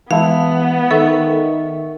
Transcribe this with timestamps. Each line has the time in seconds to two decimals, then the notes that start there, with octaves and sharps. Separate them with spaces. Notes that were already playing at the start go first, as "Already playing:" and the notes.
0.11 E3 G#3 B3 E4 F5 A5
0.91 D#3 A4 E5 C#6